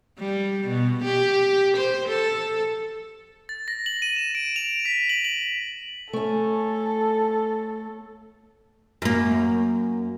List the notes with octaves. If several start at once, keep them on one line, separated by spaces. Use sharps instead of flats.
G3
B2
G4
C5
A4
A6
A#6
F#7
D#7
E7
D7
F7
B6
F#7
F#7
A3 C#4 A4
F#2 A#3